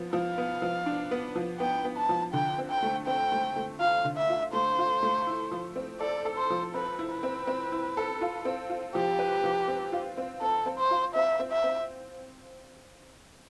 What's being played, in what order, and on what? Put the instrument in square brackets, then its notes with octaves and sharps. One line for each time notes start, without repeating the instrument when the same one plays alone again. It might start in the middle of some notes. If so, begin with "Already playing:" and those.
Already playing: [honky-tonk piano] F3 B3
[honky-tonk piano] F3 [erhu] F5
[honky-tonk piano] B3
F3
D4
B3
F3
[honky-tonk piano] B3 [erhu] G5
[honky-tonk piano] B3
[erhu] A5
[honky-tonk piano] F3
[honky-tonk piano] D3 [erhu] G5
[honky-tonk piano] C4
[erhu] G5
[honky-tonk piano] A3
[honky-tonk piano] C4 [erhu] G5
[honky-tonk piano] A3
A3
[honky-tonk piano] F4 [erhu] F5
[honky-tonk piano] D3
[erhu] E5
[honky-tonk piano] F4
[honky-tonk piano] A3 [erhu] C5
[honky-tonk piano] F4
A3
E4
F3
C4
[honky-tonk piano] A4 [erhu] D5
[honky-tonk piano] A4
[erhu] C5
[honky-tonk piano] F3
[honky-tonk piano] C4 [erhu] B4
[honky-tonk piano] E4
[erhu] B4
[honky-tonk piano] C4
C4
E4
A4
F4
C4
F4
[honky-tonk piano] F3 [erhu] G4
[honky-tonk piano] B4
F3
C4
F4
C4
[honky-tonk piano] C4 [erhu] A4
[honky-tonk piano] C4
[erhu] C5
[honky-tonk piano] F4
[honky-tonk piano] C4 [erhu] E5
[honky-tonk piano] C4
[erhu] E5
[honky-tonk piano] C4